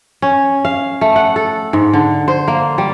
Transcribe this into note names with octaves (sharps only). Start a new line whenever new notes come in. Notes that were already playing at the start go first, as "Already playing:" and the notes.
C#4
F5
A3
F#5
A4
G#2
D3
C5
A#3
G3